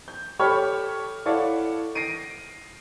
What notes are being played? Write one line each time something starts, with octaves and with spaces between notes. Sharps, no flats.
G6
G4 A4 C#5 B5 F6
E4 A4 C#5 D5 F5 F#5
A#6 C7 D7 D#7